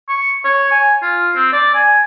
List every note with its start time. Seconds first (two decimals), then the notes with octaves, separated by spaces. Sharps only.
0.09 C#6
0.45 C#5
0.71 G#5
1.03 F4
1.35 C4
1.53 D5
1.74 G#5